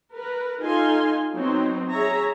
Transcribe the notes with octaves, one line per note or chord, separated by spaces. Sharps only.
A#4 B4
D#4 F4 A4 F5 G#5 C6
F#3 B3 C4 D#4
G#4 C#5 E5 A#5